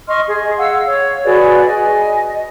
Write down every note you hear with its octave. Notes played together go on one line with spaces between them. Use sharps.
D#5 C6 C#6 F6
G#4
F5 F#5 E6
C#5
F#4 G#4 B4 D5
D#5 G#5